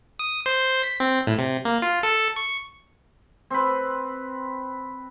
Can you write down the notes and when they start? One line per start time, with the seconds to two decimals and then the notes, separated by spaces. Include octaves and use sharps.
0.19 D#6
0.46 C5
0.83 B6
1.00 C4
1.27 A2
1.38 C3
1.65 A#3
1.82 F4
2.03 A4
2.36 C#6
3.50 C4 B4